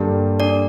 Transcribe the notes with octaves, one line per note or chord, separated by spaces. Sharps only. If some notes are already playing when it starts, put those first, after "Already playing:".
Already playing: G2 D3 G3 A#3 G4
D4 D5